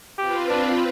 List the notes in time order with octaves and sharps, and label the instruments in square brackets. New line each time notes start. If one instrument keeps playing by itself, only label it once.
[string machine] C4 F4 B4 [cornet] G4
[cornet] D4